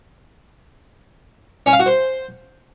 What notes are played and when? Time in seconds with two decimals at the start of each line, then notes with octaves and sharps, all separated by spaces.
1.66 C#4
1.73 F5
1.80 F#4
1.86 C5